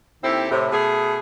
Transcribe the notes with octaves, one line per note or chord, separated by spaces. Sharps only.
D#2 C4 E4 G4 A4
A2 C3
B2 A3 G#4